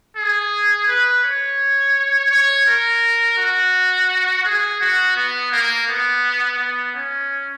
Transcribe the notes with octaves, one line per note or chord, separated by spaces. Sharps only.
G#4
B4
C#5
C#5
A#4
F#4
G#4
F#4
B3
A#3
B3
B3
C#4